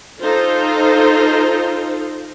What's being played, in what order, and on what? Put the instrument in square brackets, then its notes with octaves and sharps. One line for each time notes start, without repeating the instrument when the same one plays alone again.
[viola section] D#4 F4 A4 C5